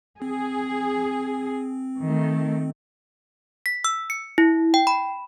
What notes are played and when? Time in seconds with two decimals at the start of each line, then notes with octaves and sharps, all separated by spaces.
0.22 C4 G#4
2.02 D#3 A3
3.66 B6
3.84 E6
4.10 C#7
4.38 E4
4.74 G5
4.87 B5